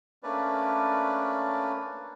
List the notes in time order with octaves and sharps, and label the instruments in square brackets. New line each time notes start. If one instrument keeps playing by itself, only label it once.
[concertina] A3 A#3 C#4 D4 B4 D5